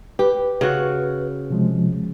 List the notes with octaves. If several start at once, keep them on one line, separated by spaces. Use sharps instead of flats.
G4 B4
C#3 F#4
C3 F3 G#3